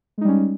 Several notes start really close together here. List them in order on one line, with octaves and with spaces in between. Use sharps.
G#3 D#4 G3 C#4